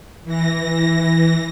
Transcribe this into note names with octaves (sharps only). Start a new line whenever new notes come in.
E3 A#6